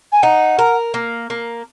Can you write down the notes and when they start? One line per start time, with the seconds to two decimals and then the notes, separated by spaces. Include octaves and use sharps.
0.12 G#5
0.23 D#4 F#5
0.59 A#4
0.94 A#3
1.30 A#3